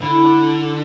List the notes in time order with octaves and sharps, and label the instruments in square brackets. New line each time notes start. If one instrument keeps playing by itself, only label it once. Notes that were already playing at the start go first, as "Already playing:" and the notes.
[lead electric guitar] D3 [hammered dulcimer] E4
[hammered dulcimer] D4